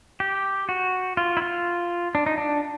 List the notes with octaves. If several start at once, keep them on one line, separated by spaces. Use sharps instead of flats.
G4
F#4
F4
E4
F4
D4
D#4
D4